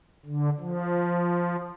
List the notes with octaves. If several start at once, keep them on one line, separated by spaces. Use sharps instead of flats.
D3
F3